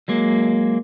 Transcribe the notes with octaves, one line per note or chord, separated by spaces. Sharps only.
F#3 G#3 A#3